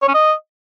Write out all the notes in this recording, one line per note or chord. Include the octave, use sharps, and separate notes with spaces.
C#5
C#4
D#5